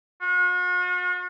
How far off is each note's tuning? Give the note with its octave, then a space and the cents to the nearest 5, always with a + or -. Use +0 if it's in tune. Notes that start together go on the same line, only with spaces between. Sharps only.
F#4 -45